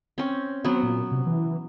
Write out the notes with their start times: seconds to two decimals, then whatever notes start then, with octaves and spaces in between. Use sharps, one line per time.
0.18 C4 C#4
0.64 F#3 B3 C4
0.83 A#2
1.12 C3
1.26 E3